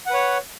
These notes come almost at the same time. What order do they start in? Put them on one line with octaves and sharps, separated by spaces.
F#5 B4 C#5